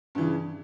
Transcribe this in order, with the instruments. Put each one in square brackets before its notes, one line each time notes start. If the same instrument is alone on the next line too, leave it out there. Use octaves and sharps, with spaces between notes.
[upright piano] G2
E3
C#3